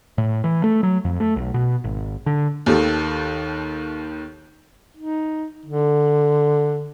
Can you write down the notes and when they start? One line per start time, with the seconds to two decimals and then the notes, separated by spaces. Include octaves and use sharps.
0.18 A2
0.44 E3
0.64 A3
0.83 F#3
1.05 F2
1.20 A3
1.36 B1
1.54 B2
1.84 G#1
2.26 D3
2.66 D#2 D#3 A4
4.97 D#4
5.66 D3